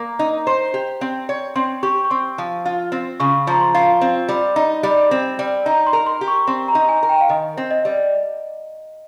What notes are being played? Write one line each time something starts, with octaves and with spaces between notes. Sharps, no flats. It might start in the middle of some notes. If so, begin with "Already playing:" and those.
Already playing: A#3 A#5
D#4
C5
G4
C4
C#5
C4 C6
G4 C#6
C#6
C4 C6
F3
F4
C4
C#3 C#6
F3 A#5
C6
F4
C4
G3
D#4
G3
C4
G3
D#4 A#5
C6
A#4
C6
G4
C#6
C4 C6
A#5
D#4
G#5
A#4
G5
F5
D#3 D#5
C4
D#5
G3